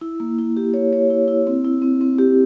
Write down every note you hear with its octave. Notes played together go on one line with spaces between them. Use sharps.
E4
A#3
E4
G4
C#5
C#5
E4
E4
C4
E4
C4
C4
G4